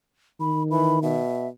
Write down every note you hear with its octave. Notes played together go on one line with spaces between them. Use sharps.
D#3 B5
E3 B5
B2 E5